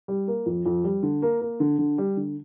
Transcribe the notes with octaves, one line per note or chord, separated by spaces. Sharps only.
G3
A#3
F2
F2
G3
D3
A#3
A#3
D3
D3
G3
D3